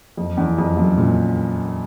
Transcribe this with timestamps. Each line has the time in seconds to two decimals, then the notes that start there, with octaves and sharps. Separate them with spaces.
0.17 F2
0.37 E2
0.58 F2
0.77 F#2
0.98 A#2